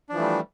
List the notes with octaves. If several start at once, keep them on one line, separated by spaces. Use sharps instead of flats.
E3 F3 G3 A3 D4